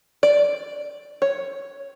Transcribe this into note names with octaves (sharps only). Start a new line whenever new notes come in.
D5
C#5